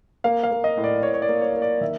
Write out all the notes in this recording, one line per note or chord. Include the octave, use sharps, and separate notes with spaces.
A#3 F5
F5
A#3
D#5
A2
D5
A2 C#5
C#5
D5
A#3
C#5
A#3
D5
D#3 E5